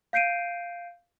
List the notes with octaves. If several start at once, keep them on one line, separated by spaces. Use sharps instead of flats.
F5 G6 C7 D7 D#7